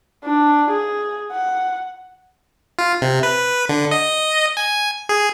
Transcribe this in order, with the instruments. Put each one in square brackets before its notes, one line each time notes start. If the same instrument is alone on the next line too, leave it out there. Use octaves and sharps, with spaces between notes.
[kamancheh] D4
G#4
F#5
[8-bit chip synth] F4
C3
B4
D3
D#5
G#5
G#4